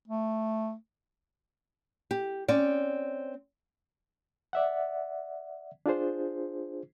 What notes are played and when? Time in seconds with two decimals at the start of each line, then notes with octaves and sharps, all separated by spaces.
0.07 A3
2.11 G4
2.48 C4 C#4 D5
4.53 D5 E5 F#5
5.86 D4 F4 G#4 C5